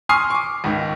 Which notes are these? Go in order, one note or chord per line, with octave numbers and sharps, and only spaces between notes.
G#5 C6 C#6 D#6 F6 C7
C#6 D6
C#2 G#2 D#3